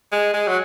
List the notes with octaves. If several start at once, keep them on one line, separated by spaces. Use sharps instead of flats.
G#3
G#3
F#3